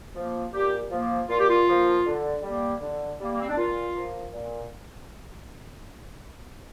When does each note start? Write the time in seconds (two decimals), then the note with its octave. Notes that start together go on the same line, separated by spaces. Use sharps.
0.15 F3 A#3
0.52 A#2 G4
0.90 F3 A#3
1.29 A#2 F4
1.39 G4
1.49 F4
1.67 F3 A#3
2.05 D3
2.42 G3 A#3
2.80 D3
3.20 G3 A#3
3.31 A#3
3.40 C4
3.48 D4
3.56 A#2 F4
3.95 F3 A#3
4.33 A#2